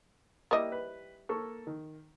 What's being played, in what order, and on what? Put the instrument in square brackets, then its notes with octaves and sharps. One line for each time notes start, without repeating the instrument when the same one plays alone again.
[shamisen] G3 E4 D#5 [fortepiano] A#3
[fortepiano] B4
A#3 A4 C#6
D#3